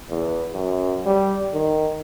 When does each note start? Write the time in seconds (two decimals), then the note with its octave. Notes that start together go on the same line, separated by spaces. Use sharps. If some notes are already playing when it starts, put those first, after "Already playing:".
0.10 E2
0.54 F#2
1.06 G3
1.53 D#3